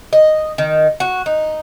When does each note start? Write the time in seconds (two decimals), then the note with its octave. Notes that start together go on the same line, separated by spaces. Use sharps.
0.13 D#5
0.58 D#3
1.00 F#4
1.26 D#4